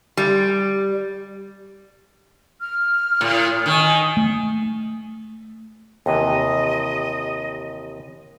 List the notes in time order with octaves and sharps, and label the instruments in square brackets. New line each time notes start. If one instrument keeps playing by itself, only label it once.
[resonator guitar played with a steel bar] G3
[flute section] F6
[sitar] A2
[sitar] D#3 [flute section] G#5
[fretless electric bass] A3
[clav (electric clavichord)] D#2 C3 E3 [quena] D#5